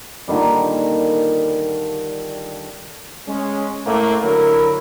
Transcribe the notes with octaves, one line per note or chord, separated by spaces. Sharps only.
A#2 D3 D#3 G3
G#3 C#4
A2 A3 A#3
D3 F#3 E4 A#4